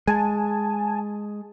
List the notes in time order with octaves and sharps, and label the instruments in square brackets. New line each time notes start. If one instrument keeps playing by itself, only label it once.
[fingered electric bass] G#3 [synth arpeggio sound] G#5 A5